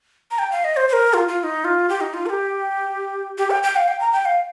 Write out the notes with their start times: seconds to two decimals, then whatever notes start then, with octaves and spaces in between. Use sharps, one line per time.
0.31 A#5
0.39 G5
0.52 F5
0.64 D#5
0.77 C5
0.89 C5
0.93 A#4
1.14 F4
1.28 F4
1.39 F4
1.43 D#4
1.64 F4
1.89 G4
2.01 D#4
2.14 F4
2.26 A#4
2.29 G4
3.38 G4
3.51 G5
3.63 G5
3.76 F5
3.88 G5
4.01 A#5
4.13 G5
4.25 F5